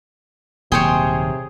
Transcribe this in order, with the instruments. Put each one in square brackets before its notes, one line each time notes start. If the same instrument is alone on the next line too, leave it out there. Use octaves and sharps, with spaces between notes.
[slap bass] D#1 D#2 F#3 [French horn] C3 [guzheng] G#4 C5 C#5 [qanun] G5